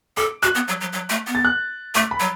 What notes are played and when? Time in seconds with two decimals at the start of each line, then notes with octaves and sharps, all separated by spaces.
0.17 A4 D6
0.43 F#4 F#6
0.55 B3
0.68 F#3
0.81 F#3
0.93 F#3
1.10 A3
1.27 B3
1.35 A6
1.45 F#6
1.95 A3 D6
2.11 B5
2.20 F#3